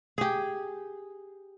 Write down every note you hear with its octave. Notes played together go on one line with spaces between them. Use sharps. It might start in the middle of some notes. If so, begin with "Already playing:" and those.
G4 G#4